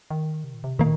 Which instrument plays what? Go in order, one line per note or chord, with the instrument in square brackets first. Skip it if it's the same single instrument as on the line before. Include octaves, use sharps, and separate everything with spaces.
[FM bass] D#3
C3
A#2
C3
[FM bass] A#2 [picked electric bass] D#3 A#3